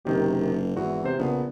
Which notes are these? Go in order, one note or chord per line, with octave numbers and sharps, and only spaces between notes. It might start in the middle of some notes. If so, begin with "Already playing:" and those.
F#1 C3 D#3 G4
G#1 E2 F#4
C3 C5
A#1 C#3 B3